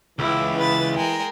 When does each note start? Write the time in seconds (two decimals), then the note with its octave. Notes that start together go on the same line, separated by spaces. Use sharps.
0.19 C#2 E3 E4 D6
0.58 B4 B5 A6
0.95 G#3 A#4 G5